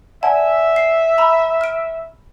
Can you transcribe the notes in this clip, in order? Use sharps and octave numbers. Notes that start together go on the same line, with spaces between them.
D5 E5 F#5 G#5 A5
C7
A#5 B5 E6
F6 D7